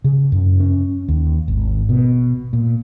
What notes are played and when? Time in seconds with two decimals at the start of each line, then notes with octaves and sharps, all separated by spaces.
0.04 C#3
0.32 F#2
0.60 C#4
1.08 D#2
1.48 G#1
1.89 B2
2.53 A#2